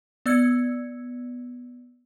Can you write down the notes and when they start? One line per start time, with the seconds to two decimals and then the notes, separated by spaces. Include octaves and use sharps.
0.26 B3 D5 E6 G#6 C#7